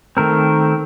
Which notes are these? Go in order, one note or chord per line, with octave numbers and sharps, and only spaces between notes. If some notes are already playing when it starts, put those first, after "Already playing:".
D#3 A3 C4 A#4